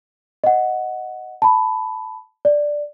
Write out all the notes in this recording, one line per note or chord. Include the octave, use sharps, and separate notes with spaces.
D#5 F#5
A5 B5
D5